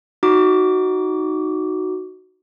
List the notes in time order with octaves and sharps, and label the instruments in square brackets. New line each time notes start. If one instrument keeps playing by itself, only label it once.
[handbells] D#4 F#4 D6